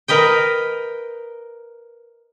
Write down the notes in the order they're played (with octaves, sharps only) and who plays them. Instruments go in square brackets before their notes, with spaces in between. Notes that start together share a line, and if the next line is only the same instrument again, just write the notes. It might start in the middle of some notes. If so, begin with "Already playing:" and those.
[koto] A#4 B4 D#5 G5